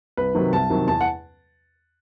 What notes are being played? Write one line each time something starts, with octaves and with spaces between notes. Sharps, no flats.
C2 B4
C3 D#3 F#3
C2 A5
C3 D#3 F#3
E2 A5
F#5